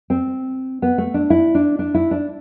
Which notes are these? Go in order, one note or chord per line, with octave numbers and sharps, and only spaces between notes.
C4
B3
A3
D4
E4
D4
D4
E4
D4